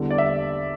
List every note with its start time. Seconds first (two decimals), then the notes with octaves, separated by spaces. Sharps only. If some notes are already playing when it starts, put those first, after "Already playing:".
Already playing: E2 D3 G3 D4
0.11 D5
0.18 E5